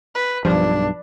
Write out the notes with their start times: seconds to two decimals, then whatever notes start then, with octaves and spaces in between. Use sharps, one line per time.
0.15 B4
0.45 B1 G2 F3 D4